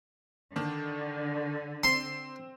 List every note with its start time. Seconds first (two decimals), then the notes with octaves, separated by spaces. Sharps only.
0.56 D3 D#3 D4
1.84 C4 C6